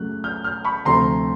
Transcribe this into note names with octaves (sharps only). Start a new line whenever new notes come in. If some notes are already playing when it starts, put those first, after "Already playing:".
Already playing: F#2 C#3 F#3 A3 F#6
F6 G6
F6 G6
B5 C#6
D2 C3 F3 A3 A#5 C6